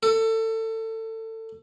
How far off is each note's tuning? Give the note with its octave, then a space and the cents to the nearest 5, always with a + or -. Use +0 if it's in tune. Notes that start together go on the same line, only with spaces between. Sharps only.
A4 +25